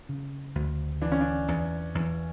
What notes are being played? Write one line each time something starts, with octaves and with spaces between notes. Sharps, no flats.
C#3
D2
E3 D4
C#4
D4
E2
E2